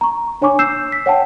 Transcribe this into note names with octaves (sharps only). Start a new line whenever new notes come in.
A#5 C#6
D4 C#5 G#5 C#6 D6
E6 G6 C7 E7
B6
C#5 F#5 G5 A5